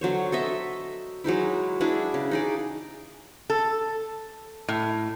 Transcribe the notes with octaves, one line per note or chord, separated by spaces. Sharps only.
D3 F#3 C5 C#5
A4 D#5 E5
F#3 G#3 D#4 E4
D4 E4 F#4 G#4
C#3
D#4 G#4 D5
A4
A2